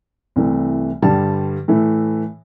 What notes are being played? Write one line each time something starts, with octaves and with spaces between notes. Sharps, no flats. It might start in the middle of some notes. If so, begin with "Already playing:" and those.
C2 C3 E3 A3
G2 D3 G3 A5
A2 E3 A3